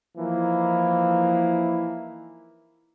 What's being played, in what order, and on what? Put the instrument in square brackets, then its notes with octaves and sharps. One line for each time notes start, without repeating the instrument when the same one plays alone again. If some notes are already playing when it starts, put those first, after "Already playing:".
[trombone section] E3 F3 A#3 D#4 E4